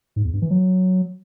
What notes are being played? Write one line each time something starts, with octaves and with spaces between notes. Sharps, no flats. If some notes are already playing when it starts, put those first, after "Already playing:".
G#2
E2
G2
E3
F#3